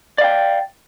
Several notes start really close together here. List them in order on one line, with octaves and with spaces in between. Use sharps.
D5 F5 G5